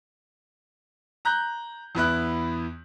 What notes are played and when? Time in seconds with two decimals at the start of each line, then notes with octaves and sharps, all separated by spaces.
1.25 A#5 F#6 G6
1.95 E2 B3 E4 F#6